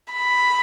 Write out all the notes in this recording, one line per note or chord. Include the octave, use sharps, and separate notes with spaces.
B5